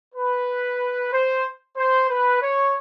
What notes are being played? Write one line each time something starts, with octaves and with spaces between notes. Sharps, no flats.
B4
C5
C5
B4
C#5